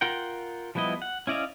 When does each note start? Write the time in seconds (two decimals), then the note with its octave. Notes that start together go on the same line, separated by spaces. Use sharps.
0.01 F4 A#4 F#5 G5
0.75 F3 G3 B3 E4 D#5
1.02 F#5
1.27 C#4 E4 D5 D#5 F5